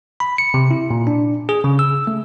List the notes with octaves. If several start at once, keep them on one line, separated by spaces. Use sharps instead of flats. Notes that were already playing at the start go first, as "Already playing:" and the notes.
B5
C#7
C3
E4
A#2
D4
G#4
C#3
E6
A3